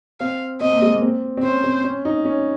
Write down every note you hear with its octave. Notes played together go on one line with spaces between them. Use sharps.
C4 F5
C4 D#5
A#3
G#3
A#3
C4
C4
C#4 C5
C4
C#4
D#4
C#4